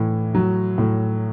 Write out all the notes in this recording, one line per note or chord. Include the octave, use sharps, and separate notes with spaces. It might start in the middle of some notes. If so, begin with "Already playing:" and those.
Already playing: A2 E3
F#3
A2